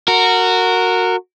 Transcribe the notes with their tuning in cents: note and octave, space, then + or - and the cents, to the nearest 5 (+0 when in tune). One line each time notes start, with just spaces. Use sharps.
F#4 -10 A#4 -20